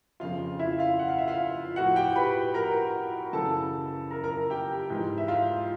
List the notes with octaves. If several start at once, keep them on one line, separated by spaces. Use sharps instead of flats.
F2 C#3 F3 F4 F5
E4 E5
F4 F5
F#5
F5
E5
F4 F5
A2 F3 F#4 F#5
G4 G5
B4 B5
A#4 A#5
F#2 C#3 E3 A4 A5
A#4 A#5
A#4 A#5
G4 G5
G#2 E3
E5
F4 F5